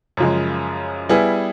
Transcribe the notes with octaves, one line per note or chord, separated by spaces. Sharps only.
F#2 C#3 F3 G#3
G3 B3 E4 G#4